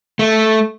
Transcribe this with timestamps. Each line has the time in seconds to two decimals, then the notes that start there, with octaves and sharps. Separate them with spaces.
0.19 A3